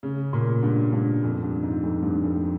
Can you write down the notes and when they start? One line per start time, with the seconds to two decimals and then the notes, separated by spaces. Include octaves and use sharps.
0.03 C#3
0.33 A#2
0.63 G2
0.93 G2
1.24 F2
1.43 G2
1.63 G#2
1.83 F2
2.02 G2
2.23 F2